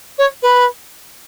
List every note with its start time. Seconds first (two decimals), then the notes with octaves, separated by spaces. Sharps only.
0.18 C#5
0.42 B4